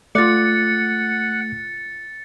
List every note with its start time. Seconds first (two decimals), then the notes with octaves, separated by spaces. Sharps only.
0.15 A3 F4 D5 F#5 A6 C#7